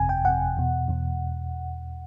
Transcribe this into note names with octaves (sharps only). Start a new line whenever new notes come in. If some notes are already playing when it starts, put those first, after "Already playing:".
Already playing: G1 F2 C3 G#5
G5
G1 F2 C3 F#5
E2 B2
E2 B2